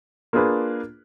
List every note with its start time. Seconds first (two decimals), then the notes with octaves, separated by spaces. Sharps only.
0.33 A#3 D4 F4 G#4 B4